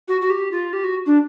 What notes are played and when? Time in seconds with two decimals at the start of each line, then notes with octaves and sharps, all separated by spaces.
0.08 F#4
0.21 F#4
0.30 G4
0.52 F4
0.73 G4
0.84 F#4
1.06 D4